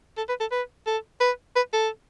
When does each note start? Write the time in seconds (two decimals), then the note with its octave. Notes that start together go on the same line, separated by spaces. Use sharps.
0.17 A4
0.29 B4
0.40 A4
0.51 B4
0.87 A4
1.21 B4
1.56 B4
1.73 A4